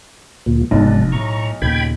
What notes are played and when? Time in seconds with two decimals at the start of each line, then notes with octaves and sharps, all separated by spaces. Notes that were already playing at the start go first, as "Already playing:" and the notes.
0.46 D2 A#2
0.71 F1 B1 G#2 D4
1.12 A2 A#5 C#6
1.62 D#2 A#2 C#3 G5 B5 G#6